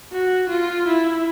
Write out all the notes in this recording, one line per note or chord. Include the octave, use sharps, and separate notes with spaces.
F#4
F4
E4